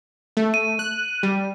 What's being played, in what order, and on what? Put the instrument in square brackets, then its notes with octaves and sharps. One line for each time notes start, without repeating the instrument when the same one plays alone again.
[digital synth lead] A3
[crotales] D#7
[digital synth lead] F#6
G3